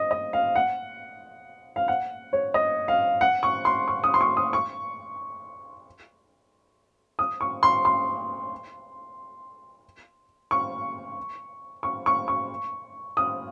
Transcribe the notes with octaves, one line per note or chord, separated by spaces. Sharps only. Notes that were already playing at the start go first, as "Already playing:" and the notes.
Already playing: D#5
D#5
F5
F#5
F5
F#5
C#5
D#5
F5
F#5
C#6
C6
C#6
D#6
C6
C#6
D#6
C#6
D#6
C#6
C6
C6
C#6
C#6
C#6
C#6
D#6